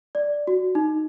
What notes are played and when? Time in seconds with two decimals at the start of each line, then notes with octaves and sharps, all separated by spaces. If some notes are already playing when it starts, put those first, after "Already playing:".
0.15 D5
0.47 F#4
0.75 D#4